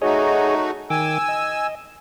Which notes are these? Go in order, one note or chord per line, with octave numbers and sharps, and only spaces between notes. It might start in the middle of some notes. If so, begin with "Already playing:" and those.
A3 D#4 F#4 G#4 C#5 D#5
D#3 G5 G#5 D6 E6
D#5